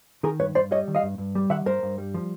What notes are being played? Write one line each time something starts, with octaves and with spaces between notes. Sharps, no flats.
D#3 G#4 A#4
G2 B4 C#5
G2 C5 D5
G3 C#5 D#5
D#3
D#5 F5
G2
G2
G3
D#3 E5 F#5
G2 A#4 C5
G2
G3
F3